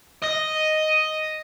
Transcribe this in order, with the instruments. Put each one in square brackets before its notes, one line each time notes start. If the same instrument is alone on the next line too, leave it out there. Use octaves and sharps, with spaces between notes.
[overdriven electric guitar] D#5